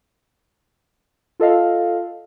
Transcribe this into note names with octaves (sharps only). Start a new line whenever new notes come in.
F4 A4 D#5 F5